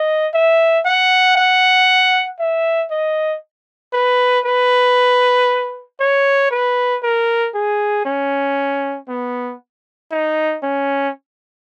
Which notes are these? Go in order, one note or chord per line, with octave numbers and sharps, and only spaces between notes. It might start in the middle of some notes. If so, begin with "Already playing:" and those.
Already playing: D#5
E5
F#5
F#5
E5
D#5
B4
B4
C#5
B4
A#4
G#4
C#4
B3
D#4
C#4